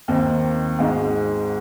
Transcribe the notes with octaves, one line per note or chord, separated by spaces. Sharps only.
D#2 D#3 C4
G#1 G#2 G#3